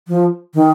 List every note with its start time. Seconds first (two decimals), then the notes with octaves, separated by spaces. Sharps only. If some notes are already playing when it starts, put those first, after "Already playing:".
0.08 F3
0.54 D#3